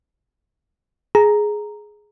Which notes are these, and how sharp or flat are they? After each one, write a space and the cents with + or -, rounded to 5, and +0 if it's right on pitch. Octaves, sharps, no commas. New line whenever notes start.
G#4 +10 A#5 +0